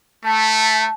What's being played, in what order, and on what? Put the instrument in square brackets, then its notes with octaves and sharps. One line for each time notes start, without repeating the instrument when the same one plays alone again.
[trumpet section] A3 [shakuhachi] A5